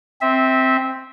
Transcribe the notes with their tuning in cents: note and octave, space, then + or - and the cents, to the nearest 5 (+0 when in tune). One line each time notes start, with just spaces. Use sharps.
C4 +0 E5 -20